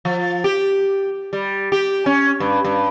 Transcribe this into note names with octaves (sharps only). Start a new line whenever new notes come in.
F3
G4
G3
G4
C#4
G2
G2